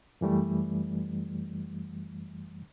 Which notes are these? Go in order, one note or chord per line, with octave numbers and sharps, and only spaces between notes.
F#2 E3 G3 A3